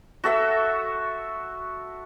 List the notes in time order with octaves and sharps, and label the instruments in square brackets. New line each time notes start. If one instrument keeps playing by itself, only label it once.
[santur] F#4 A4 E5 E6